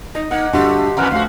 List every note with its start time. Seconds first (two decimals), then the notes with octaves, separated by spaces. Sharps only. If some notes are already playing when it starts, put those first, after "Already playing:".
0.15 D#4 D#5
0.31 A#3 D#4 F#5
0.53 G2 D3 A3 F#4 G4 C5
0.97 F2 E3 B3 A#5 F6 F#6
1.11 D2 F3 F#4 F5